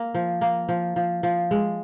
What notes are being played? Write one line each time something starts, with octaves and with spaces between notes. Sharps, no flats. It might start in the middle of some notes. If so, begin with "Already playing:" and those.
Already playing: A#3
F3
A#3
F3
F3
F3
G#3